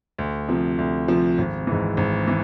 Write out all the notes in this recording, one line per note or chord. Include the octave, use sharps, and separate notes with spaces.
D2
C3 F3
D2
C3 F3
G#1
G#2 E3
G#1
E3